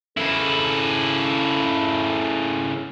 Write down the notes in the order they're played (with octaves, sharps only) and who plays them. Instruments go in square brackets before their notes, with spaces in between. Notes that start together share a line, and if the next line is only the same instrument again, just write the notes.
[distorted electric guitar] C#3 E4 [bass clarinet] A4